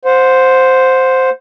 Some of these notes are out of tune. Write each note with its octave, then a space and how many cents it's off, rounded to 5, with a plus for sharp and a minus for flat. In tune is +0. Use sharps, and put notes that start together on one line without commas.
C5 +0 F#5 -35